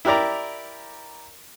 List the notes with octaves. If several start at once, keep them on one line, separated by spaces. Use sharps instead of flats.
E4 G4 A#4 D5 A#5